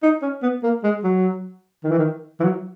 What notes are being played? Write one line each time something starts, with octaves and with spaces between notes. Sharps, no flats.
D#4
C#4
B3
A#3
G#3
F#3
D#3
E3
D#3
E3
F#3